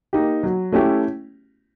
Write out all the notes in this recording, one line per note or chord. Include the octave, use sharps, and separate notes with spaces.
A#3 D#4 G4
F#3
A3 C#4 E4 G4